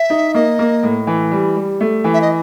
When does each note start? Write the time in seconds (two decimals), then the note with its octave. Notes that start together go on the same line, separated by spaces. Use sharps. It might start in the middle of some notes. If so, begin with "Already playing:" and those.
Already playing: E5
0.10 D#4
0.34 A#3 D#5
0.59 A#3
0.83 A2
1.07 E3
1.32 G3
1.56 G3
1.80 A3
2.04 E3
2.14 E5
2.22 D#5